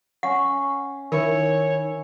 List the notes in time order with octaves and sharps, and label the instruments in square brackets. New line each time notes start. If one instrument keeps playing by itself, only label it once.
[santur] C#4 C#6 [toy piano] F#5
[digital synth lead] D#3 [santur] E4 [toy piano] A#4 [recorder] C#5